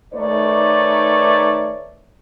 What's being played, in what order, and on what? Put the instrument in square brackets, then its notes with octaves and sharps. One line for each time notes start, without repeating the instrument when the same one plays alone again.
[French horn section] D#3 A3 D#4 B4 C#5 D5